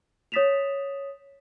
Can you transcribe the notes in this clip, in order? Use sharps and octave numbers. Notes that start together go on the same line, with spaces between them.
C#5 D#6 A6 B6 E7 F7